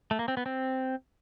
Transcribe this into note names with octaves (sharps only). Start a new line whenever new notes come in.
A3
A#3
C4
B3
C4